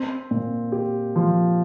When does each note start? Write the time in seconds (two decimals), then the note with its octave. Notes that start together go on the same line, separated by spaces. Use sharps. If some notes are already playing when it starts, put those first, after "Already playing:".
Already playing: C4
0.31 A#2
0.72 G4
1.16 F3